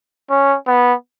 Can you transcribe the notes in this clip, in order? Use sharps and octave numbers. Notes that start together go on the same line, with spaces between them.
C#4
B3